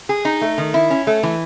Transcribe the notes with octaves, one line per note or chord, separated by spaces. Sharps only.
G#4
D#4
A3
D#3
E4
C#4
A3
E3